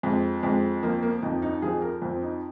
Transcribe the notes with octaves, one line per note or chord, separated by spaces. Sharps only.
F2 G#3
F2 G#3
F3 A#3
A#3
F2 D#4
D#4
F3 G#4
A#4
F2 C4
D#4